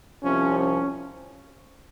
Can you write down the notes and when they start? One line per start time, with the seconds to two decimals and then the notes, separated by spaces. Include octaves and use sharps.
0.24 C2 C3 F3 C#4
0.60 C#4